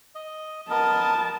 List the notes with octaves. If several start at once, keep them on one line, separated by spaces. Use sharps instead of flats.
D#5
B3 A#4 D#5 A5